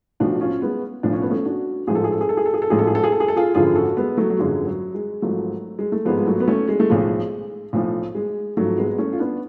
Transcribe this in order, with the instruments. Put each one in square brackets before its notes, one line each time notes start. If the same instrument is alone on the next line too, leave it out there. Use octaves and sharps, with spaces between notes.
[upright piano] B1 A2 F3 D4 F#4
C#4 F4
G#3 B3
B1 A2 F3 D4
C#4
B3
A3 C#4
D4 F#4
A1 G#2 F3 G#4
A4
G#4
A4
G#4
A4
G#4
A4
G#4
A4
A1 G#2 F3 G#4
A4
G#4
A4
G#4
A4
G#4
A4
F4 G#4
G#1 F#2 D3 F3 F4 G#4
F#4 A4
G#3 B3
F#3 A3
F#3
G#1 F#2 D3 F3 G#3
F#3
G#3
G#1 G#2 F3 F#3 A3
G#3
A3
G#1 G#2 F3 G#3 B3
G#3
F#3 A3
B3
A3 C#4
G#3
A3
B1 A2 F3 G#3
B1 A2 F3
G#3
G#1 G#2 F3 F#3 A3
G#3 B3
A3 C#4
F4
B3 D4